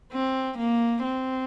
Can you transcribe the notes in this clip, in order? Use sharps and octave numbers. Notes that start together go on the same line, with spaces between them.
C4
A#3
C4